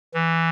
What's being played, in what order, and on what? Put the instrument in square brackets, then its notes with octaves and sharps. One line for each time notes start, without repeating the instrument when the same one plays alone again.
[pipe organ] E3